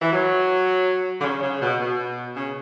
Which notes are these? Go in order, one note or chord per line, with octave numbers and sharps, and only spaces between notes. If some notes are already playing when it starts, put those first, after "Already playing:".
E3
F#3
D3
C#3
C#3
B2
B2
C#3